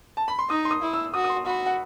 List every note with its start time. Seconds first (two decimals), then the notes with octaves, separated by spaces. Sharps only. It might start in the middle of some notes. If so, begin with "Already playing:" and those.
0.17 A5
0.28 B5
0.39 C6
0.50 D#4 D#6
0.65 C6
0.71 D#6
0.82 E4
0.93 E6
1.14 F#4 D#6
1.24 D#6
1.30 C6
1.46 F#4 B5
1.66 F#5